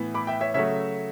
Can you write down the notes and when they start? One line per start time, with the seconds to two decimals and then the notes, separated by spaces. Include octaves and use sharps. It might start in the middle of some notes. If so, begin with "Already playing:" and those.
Already playing: A2 E3 B3
0.14 B5 D6
0.27 E5 G5
0.41 C#5 E5
0.54 C#3 F#3 A3 C#5 E5